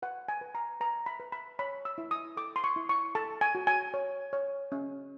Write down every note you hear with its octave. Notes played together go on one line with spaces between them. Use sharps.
B4 F#5
G#5
B4
A#5
B4 A#5
B5
B4
B5
C#5 B5
E6
E4
D#6
A4 D6
C6
C#6
E4
C#6
A4 A5
G#5
F#4
G#5
C#5
C#5
C#4